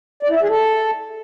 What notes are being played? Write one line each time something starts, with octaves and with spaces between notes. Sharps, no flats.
D5
E4
E5
G#4
A4